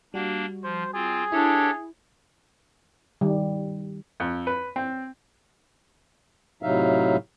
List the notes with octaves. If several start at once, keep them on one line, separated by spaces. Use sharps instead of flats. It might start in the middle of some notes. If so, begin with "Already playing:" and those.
G3 A#3 D4 F#4
F3 C5
C4 F4 G#4
D4 E4 G4 A4 C#5
D#3 G3
F2
B4
C4
A2 C3 F#3 D#4 E5 F5